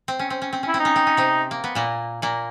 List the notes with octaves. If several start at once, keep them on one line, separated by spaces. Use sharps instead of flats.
C4
C#4
C4
C#4
C4
C#4 E4
C4
D#4
C#4
C4
C#4
C3 C4
A#3
B3
A#2 A#3
A#2 A#3